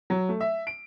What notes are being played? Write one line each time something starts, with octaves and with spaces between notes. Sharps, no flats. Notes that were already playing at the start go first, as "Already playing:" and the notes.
F#3
A3
E5
D7